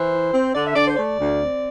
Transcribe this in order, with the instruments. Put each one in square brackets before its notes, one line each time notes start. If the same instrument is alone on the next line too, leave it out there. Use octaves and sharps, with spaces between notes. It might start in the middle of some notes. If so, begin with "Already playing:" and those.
Already playing: [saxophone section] E3 C5
E4
C4
D3 D5
E5
D3 D5
C5
A3 D5
D2
C4